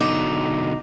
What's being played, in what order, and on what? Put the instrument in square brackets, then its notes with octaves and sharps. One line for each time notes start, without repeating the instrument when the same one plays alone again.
[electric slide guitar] B2 D3 F#3 [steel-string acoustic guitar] D#4 [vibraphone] D6